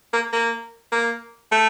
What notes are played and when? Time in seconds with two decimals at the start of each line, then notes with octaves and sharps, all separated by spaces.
0.13 A#3
0.33 A#3
0.92 A#3
1.52 A3